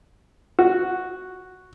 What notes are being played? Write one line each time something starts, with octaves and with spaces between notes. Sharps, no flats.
F#4